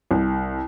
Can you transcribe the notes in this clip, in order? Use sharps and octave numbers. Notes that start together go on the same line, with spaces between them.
C2